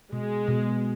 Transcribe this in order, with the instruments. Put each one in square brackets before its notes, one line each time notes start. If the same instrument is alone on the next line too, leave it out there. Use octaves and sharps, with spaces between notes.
[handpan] B2 [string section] G#3
[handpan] B2